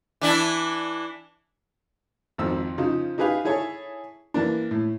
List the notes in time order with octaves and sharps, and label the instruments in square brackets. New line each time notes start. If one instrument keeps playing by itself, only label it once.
[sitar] E3 D4 E4
[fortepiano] G#1 F2 E6
C#3 F3 D#4
D#4 G4 G#4 B4 F5
E4 G#4 A4 C#5
E3 A#3 D4
A2